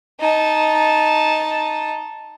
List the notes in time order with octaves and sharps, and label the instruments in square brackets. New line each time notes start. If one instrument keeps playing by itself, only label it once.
[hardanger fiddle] D#4 A5